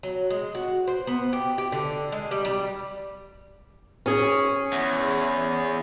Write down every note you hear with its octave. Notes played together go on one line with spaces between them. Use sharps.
F#3
G#3
F#4
C5
B3
G4
G4
D3
G#3
G3
G3
C#4 G#4
E2